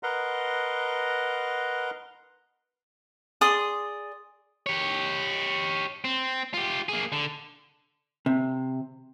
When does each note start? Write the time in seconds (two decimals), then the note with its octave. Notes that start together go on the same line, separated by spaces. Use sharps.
0.03 A#4 B4 D#5 F#5 A#5 C6
3.41 G#4 D5 C6 D#6
4.66 G4 C#5
6.04 C4
6.54 F4 G4
6.89 A#3 G#4
7.12 D3
8.26 C3